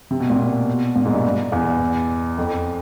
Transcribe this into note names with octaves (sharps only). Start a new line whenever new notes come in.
C3
B2
A#2
B2
A#2
G#2
G2
E2
F2